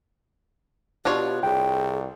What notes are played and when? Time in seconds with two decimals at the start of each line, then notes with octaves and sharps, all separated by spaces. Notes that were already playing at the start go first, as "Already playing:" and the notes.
1.05 B2 D4 F4 G4 C#5
1.43 C2 G#4 G5